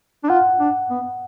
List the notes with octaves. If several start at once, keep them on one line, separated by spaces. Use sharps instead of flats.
D4
F4 F#5
D4
B3